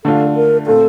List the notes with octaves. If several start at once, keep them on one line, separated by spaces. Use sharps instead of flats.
D3 A3 D4 F4 A4
A#4
A#2 A3 C4 A4